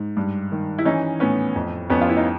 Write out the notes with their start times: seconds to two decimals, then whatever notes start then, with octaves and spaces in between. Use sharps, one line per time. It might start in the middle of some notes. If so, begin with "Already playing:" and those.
Already playing: G#2
0.17 G2
0.52 D#3
0.78 E4
0.85 E3 C#4 D#4
1.20 A2 B3 C#4
1.56 F2
1.90 F2 B3 C#4
2.01 F4
2.09 E4
2.16 D#4